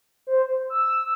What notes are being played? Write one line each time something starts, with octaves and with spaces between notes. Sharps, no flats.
C5
E6